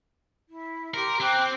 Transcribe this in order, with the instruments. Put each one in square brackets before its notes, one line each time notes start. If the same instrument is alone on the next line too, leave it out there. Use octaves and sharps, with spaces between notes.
[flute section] E4
[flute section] G4 C6 [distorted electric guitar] A#4
[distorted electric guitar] C4 [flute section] G5 D6 F#6